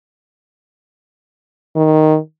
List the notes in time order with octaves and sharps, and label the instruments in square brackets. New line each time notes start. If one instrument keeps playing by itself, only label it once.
[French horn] D#3